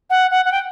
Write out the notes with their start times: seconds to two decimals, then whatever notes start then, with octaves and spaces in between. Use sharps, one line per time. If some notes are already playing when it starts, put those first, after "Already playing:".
0.10 F#5
0.31 F#5
0.45 F#5
0.52 G5